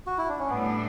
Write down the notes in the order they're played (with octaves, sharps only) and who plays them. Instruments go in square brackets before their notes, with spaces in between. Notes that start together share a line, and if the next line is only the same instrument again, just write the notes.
[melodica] F#4
E4
D4
C#4
[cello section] A2 G3 D4 [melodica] B3